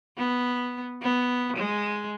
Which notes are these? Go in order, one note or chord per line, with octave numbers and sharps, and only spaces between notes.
B3
B3
G#3